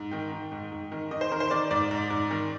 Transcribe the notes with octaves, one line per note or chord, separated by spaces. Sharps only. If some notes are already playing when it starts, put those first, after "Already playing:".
Already playing: G#2
D#3 G5
D#3
G#2
G#2
D#3
D#3 D#5
C5
D#3 A#4
C5
D#3 D5
G#2 D5
G#2
G#2
D#3